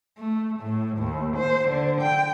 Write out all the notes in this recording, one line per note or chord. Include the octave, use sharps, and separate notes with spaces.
A3
A2
D#2
C5
D3
G5